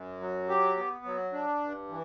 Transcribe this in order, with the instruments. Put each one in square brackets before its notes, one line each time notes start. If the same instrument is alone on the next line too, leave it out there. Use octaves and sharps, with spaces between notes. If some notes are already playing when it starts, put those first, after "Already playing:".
Already playing: [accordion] F#2
F#3
G4
B3
F#3
D4
G2
E3